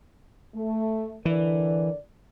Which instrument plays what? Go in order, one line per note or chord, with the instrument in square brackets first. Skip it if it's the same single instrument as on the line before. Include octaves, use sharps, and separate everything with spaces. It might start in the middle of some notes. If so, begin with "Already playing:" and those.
[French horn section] A3
[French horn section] D3 A#4 D5 [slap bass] E3